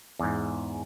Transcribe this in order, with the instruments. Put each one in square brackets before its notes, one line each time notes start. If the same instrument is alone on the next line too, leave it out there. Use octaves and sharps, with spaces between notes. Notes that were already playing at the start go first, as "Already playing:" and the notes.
[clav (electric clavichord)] E2 G#2